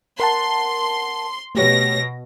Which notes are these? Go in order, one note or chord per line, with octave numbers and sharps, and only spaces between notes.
A#4 F#5 A5 C6
B2 A3 G4 C#5 A#6